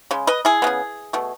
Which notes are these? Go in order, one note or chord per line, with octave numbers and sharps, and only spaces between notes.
C#3 G#3
B4 D#5
E4 G#4
C#3 G#3 B3
B2 A3